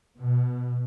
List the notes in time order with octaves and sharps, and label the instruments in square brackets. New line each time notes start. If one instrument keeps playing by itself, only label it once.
[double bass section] B2